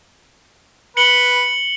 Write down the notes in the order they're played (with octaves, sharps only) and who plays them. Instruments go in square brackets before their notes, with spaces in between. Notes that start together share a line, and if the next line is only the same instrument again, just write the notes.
[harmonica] B4 [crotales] C#7 F#7 G7